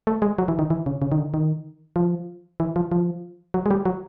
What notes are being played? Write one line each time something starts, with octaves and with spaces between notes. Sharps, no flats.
A3
G#3
F#3
E3
D#3
E3
C#3
C#3
D#3
D3
D#3
F3
E3
F3
F3
F#3
G#3
G3
F#3